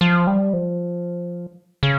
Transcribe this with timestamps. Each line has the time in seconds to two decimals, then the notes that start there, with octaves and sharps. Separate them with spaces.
0.01 F3
0.27 G3
0.53 F3
1.83 C#3